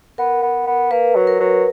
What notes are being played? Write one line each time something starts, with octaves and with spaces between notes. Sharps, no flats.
B3 A#4
B3
B3
A#3 B4
F#3
A#4
F#3